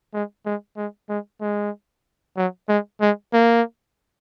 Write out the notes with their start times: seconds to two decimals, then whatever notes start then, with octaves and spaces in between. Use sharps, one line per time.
0.13 G#3
0.45 G#3
0.77 G#3
1.09 G#3
1.41 G#3
2.37 F#3
2.68 G#3
3.01 G#3
3.33 A#3